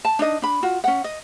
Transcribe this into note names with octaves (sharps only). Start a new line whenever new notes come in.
A5
D4 D#4 D#5
D4 B5
F4 F#4
C#4 F#5
D#5